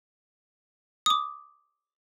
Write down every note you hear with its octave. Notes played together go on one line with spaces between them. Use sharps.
D6 D#6